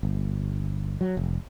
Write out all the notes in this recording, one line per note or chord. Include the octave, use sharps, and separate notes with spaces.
G1
F#3
F1